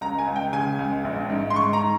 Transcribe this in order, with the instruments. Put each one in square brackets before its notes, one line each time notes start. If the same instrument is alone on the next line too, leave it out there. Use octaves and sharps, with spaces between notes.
[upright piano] C#2 A#5
G#5
C#2
G5
C#3 G#5
C#2
A#1
G#2
C6
G#2 C#6
A#5